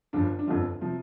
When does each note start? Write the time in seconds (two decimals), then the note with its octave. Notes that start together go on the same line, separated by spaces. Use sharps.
0.13 G1 G2 F3 D4
0.39 D4
0.47 G1 F2 D3 F3 F4
0.81 C3 F3 F4